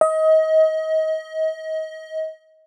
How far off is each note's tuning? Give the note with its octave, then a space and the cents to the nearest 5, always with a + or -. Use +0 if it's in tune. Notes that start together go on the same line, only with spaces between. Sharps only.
D#5 +30